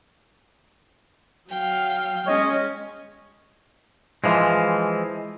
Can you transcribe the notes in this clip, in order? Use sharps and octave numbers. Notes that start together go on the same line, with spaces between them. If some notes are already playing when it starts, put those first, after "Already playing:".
F#3 F5 G5
G#3 C#4 C#5 D#5
E3 F3 G#3